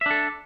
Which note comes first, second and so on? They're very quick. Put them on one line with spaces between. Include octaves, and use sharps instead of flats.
E5 D4 A4